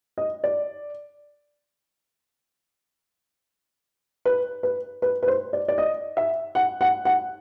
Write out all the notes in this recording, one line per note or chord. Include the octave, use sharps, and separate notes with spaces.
D#5
D5
B4
B4
B4
B4
C5
D5
D5
D#5
E5
F#5
F#5
F#5